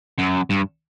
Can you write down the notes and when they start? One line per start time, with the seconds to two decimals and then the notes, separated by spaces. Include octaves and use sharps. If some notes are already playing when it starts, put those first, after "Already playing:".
0.19 F#2
0.50 G2